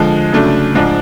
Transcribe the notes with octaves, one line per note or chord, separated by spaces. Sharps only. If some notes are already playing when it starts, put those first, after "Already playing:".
Already playing: D3 F3 G#3
C#3 F#3 A3 D4
G#2 F3 G#3 D4